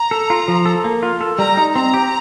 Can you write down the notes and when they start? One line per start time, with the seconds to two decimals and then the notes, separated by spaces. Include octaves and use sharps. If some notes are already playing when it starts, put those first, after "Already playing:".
Already playing: A#5
0.11 A4
0.30 F4
0.48 F3
0.66 A4
0.84 A#3
1.03 F4
1.21 A4
1.39 G3 A#5
1.57 D#4
1.76 C4 A#5
1.94 G4